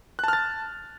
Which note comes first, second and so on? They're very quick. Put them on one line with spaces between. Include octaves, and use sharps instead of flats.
F#6 A5 F6 A6